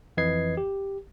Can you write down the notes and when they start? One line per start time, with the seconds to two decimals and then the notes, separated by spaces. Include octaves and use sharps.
0.17 F2 E3 B4 D#5 G#6 C7
0.57 G4